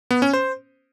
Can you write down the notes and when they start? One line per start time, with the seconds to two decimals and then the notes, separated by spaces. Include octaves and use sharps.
0.11 B3
0.22 C#4
0.33 C5